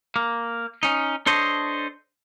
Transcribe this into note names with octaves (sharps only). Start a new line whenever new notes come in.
A#3
C#4 D#4
D4 A4 C5 C#5 D#5